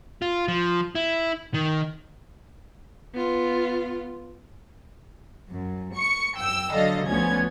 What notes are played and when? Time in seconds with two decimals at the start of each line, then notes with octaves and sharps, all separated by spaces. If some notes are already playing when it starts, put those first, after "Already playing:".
0.22 F4
0.48 F3
0.95 E4
1.54 D#3
3.14 B3 F4
5.52 F#2
5.95 C#6 C#7
6.37 F#2 G5 E6
6.73 D3 F#3 A4 D#5 F5
7.09 D2 F3 B3 C#4 G#6